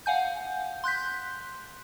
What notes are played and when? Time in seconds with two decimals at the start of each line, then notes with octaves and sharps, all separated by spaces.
0.06 F5 F#5 G#5 G6
0.84 C6 F#6 G6 B6